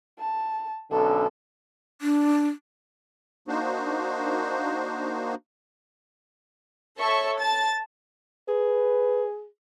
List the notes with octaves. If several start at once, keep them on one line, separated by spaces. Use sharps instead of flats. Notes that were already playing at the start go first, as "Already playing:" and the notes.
A5
B1 D3 C#4 A4
D4
A#3 D4 D#4 F#4 C5
A4 C#5 E5 C#6
A5 A6
G#4 B4